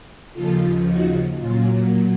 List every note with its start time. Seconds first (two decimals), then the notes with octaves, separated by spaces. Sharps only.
0.33 D#2 C#3 F3 F4 A4
0.86 D#4 F#4
1.39 A#2 F#3 C#4 F4